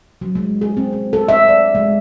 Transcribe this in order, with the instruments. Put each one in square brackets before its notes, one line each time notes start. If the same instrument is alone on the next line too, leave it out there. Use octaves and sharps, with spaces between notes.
[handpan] F#3
G#3
G#4
C4
C4
A4
E5
D5
G#3